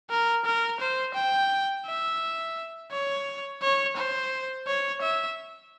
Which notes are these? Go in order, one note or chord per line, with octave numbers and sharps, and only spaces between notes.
A#4
A#4
C5
G5
E5
C#5
C#5
C5
C#5
E5